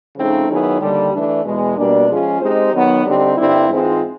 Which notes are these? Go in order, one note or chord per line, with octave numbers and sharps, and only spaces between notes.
C#3 F3 A3 C4 D#4
D#3 F#3 B3 E4 G#4
D#2 D3 G3
E3 A3 D4
E2 B2 G#3
B2 G3 A#3 D4
F3 G#3 C#4 F4 G#4
G#3 C4 D#4 G4 C5
D#3 F#3 B3
D3 G3 C4 D#4 G4
G2 D3 G3 C4 E4
G#2 E3 G#3 C4 F4